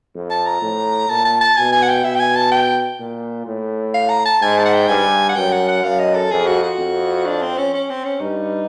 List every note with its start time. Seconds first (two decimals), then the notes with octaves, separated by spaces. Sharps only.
0.15 F2
0.31 A5
0.46 A#5
0.62 A2
1.09 A#2 A5
1.25 A5
1.41 A5
1.57 B2 G#5
1.73 G#5
1.82 F#5
1.89 G5
2.04 B2 E5
2.16 G5
2.20 G#5
2.36 A5
2.52 G5
3.00 A#2
3.47 A2
3.94 F5
4.10 A#5
4.25 A5
4.42 G#2 G#5
4.58 A5
4.66 F#5
4.74 G5
4.89 G2 G#5
5.29 F#5
5.36 F#2 G5
5.52 F#5
5.68 F#5
5.83 F#2 F5
5.99 D#5
6.15 A4
6.31 F2 G#4
6.47 F#4
6.63 F#4
6.79 F2
7.26 D4
7.42 C4
7.58 C#4
7.74 C#4
7.90 C4
8.05 C#4
8.20 G2 D#4